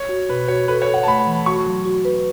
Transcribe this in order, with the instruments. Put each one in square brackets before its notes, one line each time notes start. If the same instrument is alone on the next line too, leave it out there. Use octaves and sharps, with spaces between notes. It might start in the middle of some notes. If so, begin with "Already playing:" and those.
Already playing: [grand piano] C#5
[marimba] F#4
[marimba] B2 [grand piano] B4
[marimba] F#4 [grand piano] C#5
[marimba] A4 [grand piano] B4
[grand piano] C#5
[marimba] A4
[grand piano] F#5
A5
[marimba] A3 [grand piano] B5
[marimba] E3
[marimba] F#4 [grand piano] C#6
[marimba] F#3
F#4
B4